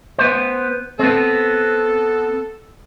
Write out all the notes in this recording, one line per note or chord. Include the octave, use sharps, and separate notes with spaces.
B3 C5
B3 C4 A4